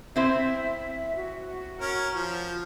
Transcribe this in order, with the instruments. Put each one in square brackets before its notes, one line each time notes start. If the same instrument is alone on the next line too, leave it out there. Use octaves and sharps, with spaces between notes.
[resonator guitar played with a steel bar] C4 E4 C5 [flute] E5
[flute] F#4
[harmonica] C#4 A#4
F3